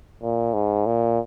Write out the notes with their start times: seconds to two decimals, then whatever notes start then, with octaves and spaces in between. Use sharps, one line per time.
0.22 A#2
0.54 G#2
0.86 A#2